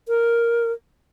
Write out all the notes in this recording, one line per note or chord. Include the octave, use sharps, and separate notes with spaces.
A#4